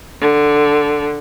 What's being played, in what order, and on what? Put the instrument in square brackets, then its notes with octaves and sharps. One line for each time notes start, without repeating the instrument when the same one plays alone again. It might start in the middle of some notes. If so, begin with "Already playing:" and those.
[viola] D3